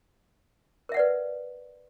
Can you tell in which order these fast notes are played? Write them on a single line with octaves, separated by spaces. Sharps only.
A#4 E5 F#5 D5 B4